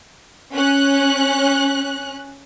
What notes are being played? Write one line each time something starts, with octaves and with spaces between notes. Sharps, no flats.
C#4 F#6